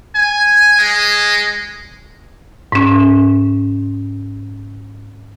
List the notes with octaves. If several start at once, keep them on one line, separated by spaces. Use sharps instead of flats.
G#5
G#3
G#2 C#4